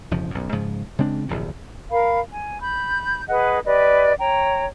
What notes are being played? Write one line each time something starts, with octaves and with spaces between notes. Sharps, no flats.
E1 F2 C#3 F3
B1 F#2
G#2 C#3 F3
C#3 G#3 C4 D4
D1 A#1 E2 C3
A#4 F5 B5
G#5
B5 G6
G#4 B4 D#5 F#5
G4 B4 D5 D#5
C#5 G5 A#5